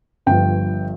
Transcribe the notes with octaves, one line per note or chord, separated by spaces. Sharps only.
G1 G2 F3 G5